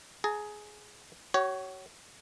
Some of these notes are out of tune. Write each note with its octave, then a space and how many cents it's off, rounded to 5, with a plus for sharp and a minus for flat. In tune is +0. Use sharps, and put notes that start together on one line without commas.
G#4 +15 A#5 -25
F#4 +40 C#5 +0